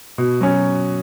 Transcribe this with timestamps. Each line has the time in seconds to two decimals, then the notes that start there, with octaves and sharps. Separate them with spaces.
0.18 B2
0.41 F#3 C#4